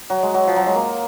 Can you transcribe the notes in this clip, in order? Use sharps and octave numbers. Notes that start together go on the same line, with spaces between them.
F#3
G#3
F#3
F3
F#3
G#3
A#3